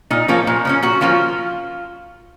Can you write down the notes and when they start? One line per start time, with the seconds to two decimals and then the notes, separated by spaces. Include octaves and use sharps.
0.11 A#2 D#4
0.28 F3 A#3 C#4
0.47 A#2
0.65 F3 A#3 C#4
0.83 A#2 F#4
1.01 F3 A#3 C#4 F4